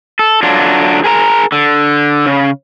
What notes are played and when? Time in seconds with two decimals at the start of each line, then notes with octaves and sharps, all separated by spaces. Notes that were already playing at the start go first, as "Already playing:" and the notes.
0.19 A4
0.43 D3 F#3 D4 F4
1.04 G#4 A#4 G#5 A#5
1.52 D3
2.26 C#3